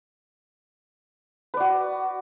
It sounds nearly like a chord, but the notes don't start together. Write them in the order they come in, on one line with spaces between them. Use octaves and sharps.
B4 D5 F#4